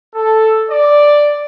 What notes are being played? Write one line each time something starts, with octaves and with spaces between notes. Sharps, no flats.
A4
D5